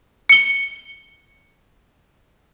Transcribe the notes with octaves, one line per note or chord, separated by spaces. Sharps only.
C#7 G7